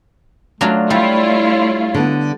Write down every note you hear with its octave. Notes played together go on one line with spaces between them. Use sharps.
F#3 A3 D4 F4
G3 E4 F4 C#5
D3 B3